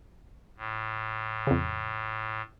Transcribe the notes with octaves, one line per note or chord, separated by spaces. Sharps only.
A2
F2 C#3